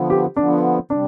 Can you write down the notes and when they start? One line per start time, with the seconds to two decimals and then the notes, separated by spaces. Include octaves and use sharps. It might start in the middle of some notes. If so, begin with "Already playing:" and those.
Already playing: D3 F3 B3
0.10 G4
0.36 D3 F3 B3 D4
0.90 C3 G3 D4